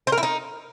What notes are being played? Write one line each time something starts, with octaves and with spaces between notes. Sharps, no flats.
C5
A#4
E4
D#4